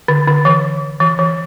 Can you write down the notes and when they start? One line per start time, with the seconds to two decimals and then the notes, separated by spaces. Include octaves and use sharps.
0.08 D3
0.28 D3
0.45 E3
1.01 E3
1.19 E3